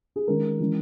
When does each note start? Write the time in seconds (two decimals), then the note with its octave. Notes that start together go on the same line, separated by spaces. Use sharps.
0.16 G#4
0.28 D#3 G#3 C#4 A#4
0.60 E3 G#3 C#4